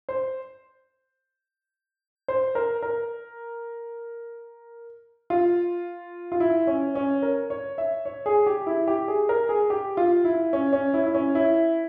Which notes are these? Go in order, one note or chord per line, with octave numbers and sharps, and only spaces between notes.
C5
C5
A#4
A#4
F4
F4
E4
C#4
C#4
A#4
C#5
E5
C#5
G#4
G4
E4
G4
G#4
A#4
G#4
G4
F4
E4
C#4
C#4
E4
E4
C#4
E4